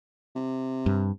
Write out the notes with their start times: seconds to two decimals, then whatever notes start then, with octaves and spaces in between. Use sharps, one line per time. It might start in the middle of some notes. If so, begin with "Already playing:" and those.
0.36 C3
0.86 G2